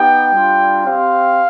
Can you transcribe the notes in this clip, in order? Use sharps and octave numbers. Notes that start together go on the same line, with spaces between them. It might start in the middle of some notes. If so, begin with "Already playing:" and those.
Already playing: B3 D#4 G4 G5
G3 D4 F4
C4 G4 F5